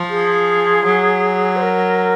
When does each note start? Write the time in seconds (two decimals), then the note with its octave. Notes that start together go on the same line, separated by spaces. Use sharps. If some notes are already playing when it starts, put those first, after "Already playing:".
Already playing: F3
0.10 G#4
0.86 F#3
1.56 C5
1.62 A#4